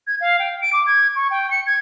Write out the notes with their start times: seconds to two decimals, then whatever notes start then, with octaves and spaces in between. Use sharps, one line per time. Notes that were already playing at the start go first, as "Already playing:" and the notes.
0.07 G#6
0.21 F5
0.39 G5
0.61 D7
0.73 D6
0.87 G#6
1.16 C#6
1.31 G5
1.51 C#7
1.67 G#6